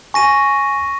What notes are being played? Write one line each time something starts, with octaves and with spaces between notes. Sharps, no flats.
G#5 C#6 A#6 D#7